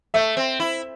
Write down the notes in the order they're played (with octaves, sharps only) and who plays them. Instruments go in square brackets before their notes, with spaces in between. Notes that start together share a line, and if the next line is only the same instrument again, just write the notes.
[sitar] A3 [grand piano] E5
[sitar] C4
E4